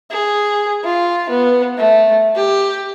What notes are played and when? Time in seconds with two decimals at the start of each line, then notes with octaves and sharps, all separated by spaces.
0.11 G#4
0.84 F4
1.29 B3
1.77 A3
2.35 G4